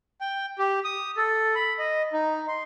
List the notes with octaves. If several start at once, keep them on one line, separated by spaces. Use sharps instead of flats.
G5
G4
D#6
A4
B5
D#5
D#4
C6